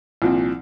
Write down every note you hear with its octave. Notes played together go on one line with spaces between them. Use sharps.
C2 A#2 F3 C4